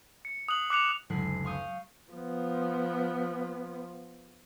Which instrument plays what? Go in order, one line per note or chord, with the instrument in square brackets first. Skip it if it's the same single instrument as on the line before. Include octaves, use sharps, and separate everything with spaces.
[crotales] C#7
D#6 F#6 F#7
D6 F#6 C#7 F7
[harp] F#1 D2 G#3 F#6 B6 C7
F5 C#6 D#6 G6
[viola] F3 B3